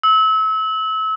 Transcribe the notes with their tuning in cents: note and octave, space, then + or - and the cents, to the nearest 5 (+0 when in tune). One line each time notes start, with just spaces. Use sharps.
E6 -30